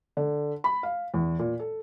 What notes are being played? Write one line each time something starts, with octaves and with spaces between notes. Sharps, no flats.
D3
B5
F5
E2
A#2
A4